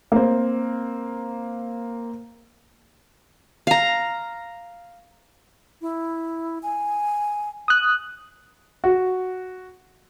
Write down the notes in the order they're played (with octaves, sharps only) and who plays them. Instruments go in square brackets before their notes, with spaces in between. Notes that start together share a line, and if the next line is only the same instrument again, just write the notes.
[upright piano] A#3 C4
[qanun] F5 A#5
[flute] E4
G#5
[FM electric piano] D#6 F#6
[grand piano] F#4